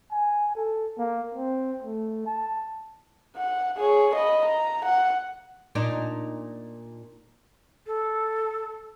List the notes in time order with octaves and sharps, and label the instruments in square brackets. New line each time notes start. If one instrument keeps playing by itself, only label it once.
[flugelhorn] G#5
A4
A#3
C4
A3
A5
[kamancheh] F#5
G#4 C#5
D#5 B5
A#5
F#5
[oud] A#2 D4 D#4
[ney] A4